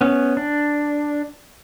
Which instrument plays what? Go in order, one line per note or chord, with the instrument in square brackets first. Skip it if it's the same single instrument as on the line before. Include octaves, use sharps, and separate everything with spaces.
[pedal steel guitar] B3 C#4
D4